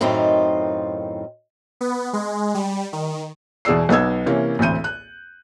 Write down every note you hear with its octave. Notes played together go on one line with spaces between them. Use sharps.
F#2 A2 D#3 C4 D#4 F4
B3
G#3
G3
D#3
E2 B2 G#4 D5 E6 C7
B1 B3 D#4 E6 G#6
C3 E3 A#3 C#4
A1 D2 C4 G6 D#7
F#6